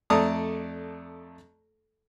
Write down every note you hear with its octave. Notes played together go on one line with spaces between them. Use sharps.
F2 A3 D5 A5 A#5 D#6